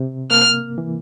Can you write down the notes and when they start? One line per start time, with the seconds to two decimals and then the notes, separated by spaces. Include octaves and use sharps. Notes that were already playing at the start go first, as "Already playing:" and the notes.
Already playing: C3
0.31 A#3 F6
0.78 E3